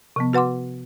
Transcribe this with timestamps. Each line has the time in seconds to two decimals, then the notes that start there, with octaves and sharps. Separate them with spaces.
0.16 C3 F3 B3
0.33 F#4 B4 F#5 C6 D6